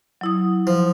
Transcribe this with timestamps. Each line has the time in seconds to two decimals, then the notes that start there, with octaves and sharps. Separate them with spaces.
0.21 F#3 E4 D#6
0.67 F3